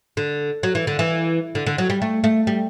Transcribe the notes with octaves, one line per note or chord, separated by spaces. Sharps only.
D3
F#3
E3
D3
E3
D3
D3
F#3
G3
A3
A3
G3